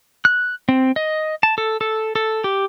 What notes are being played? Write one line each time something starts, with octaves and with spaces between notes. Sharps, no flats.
F#6
C4
D#5
A5
A4
A4
A4
G4